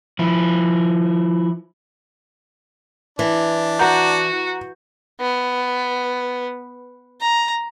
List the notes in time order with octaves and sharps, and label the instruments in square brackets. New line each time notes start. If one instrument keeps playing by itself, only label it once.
[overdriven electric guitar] F3 E4
[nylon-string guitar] E3 [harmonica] D4
[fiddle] F#4 [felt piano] F#5 A#5 G6
[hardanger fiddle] B3
A#5